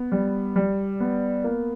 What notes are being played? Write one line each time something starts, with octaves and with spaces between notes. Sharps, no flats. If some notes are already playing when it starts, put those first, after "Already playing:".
Already playing: B3
G3
G3
B3
A#3